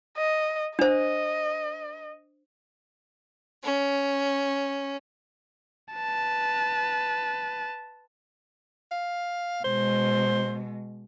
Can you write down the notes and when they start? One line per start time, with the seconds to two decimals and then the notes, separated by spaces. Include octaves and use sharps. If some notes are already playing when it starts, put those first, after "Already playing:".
0.17 D#5
0.79 D4 C5 D#5
3.62 C#4
5.95 B4 A5
8.91 F5
9.64 B2 G#3 C5